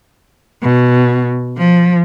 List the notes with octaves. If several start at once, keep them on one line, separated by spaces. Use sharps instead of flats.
B2
F3